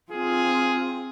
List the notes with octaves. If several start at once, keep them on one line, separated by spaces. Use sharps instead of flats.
C4 F4 G#4